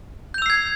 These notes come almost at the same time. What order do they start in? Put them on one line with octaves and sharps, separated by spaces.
G6 F7 E6 C7 G#6